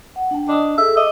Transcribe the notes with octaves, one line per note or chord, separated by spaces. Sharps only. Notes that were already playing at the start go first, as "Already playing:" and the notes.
F#5
D4 G5 A5
D4 D#5 D#6
G#4 A4 E5
D#5 E5 D6